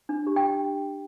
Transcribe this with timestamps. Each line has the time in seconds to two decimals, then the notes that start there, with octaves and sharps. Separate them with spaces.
0.09 D4
0.27 G4
0.36 G5